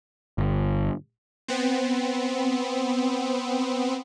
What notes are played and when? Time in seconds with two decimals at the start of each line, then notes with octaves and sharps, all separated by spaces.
0.38 G1
1.48 B3 C4